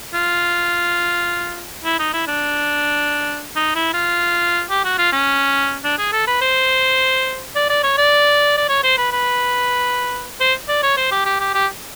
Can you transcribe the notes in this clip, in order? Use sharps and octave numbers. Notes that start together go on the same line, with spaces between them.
F4
E4
D#4
E4
D4
D#4
E4
F4
G4
F#4
F4
C#4
D4
G#4
A4
B4
C5
D5
D5
C#5
D5
D5
C#5
C5
B4
B4
C5
D5
C#5
C5
G4
G4
G4
G4